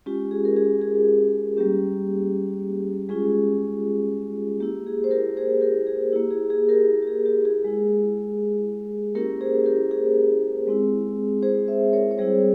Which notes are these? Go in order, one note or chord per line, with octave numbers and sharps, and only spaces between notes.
G#3 C#4 F4 G4
G#4
A#4
G#4
G#4
G3 A#3 C#4 G4
G#3 C#4 F4 G#4
A#3 E4 G4
G#4
C5
G4 A#4
G#4 C5
G4 A#4
G#4
A#3 E4 G4
G#4
G#4
G4 A#4
G4
G#4
G4
G#4
G#3 E4
A#3 C#4 E4 G4 A#4
G#4 C5
G4 A#4
G#4
G#3 C4 E4
G#4 C5
C5 E5
A#4 C#5
C#5
G3 C4 E4 G#4 C5